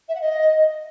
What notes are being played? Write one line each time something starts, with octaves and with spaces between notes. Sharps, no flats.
E5
F#5
D#5